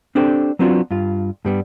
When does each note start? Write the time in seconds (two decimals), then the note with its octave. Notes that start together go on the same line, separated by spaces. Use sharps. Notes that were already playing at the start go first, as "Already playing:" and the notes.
0.15 C4 D4 G4 A4 C5
0.59 F#3 B3 C4 D4 F4 F#4
0.91 G2 F4
1.45 G2 G3 B3